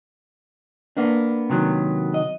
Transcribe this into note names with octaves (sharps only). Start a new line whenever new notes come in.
A#3 B3 D4
C3 D#3 F#3
D#5